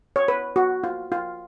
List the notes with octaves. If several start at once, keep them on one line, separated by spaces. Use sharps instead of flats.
C#5
B4
F#4
F4
F4